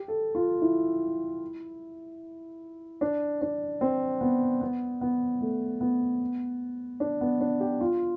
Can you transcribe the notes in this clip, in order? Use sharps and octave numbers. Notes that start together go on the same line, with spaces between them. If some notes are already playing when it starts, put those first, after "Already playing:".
Already playing: G4
A4
F4
E4
D4
D4
C4
B3
B3
B3
A3
B3
D4
B3
D4
G4
F4